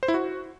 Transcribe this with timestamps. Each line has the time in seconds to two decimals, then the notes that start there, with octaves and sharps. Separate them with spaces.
0.03 C5
0.08 E4
0.14 F#4